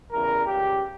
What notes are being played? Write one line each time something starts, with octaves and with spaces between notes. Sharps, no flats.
E2 C#3 E3 G3 A#4
C#2 C#3 G3 G4